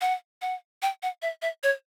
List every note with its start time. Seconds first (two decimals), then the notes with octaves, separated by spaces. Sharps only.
0.01 F#5
0.42 F#5
0.82 G5
1.02 F#5
1.22 E5
1.42 E5
1.63 C#5